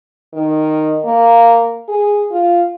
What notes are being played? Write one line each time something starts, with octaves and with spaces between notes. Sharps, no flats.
D#3
A#3
G#4
F4